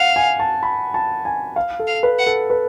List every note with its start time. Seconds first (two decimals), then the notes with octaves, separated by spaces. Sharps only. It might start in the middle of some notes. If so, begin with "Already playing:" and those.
Already playing: F5 F#5
0.16 G#5
0.40 A5
0.63 B5
0.94 A5
1.25 G#5
1.56 F5
1.79 A4
1.87 F5
2.03 B4
2.19 F#5
2.27 A4
2.50 B4